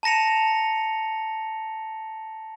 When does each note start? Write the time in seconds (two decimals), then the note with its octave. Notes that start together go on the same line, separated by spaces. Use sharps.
0.03 A5 A#5 A#6 C#7 F7